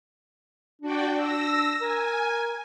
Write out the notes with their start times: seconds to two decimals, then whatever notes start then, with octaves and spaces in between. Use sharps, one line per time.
0.82 D4 F#4 D5 G5
1.16 E6 A#6
1.81 A#4 G#5